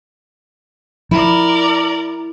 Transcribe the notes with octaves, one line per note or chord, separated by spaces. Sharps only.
F3 E4 A#4 D5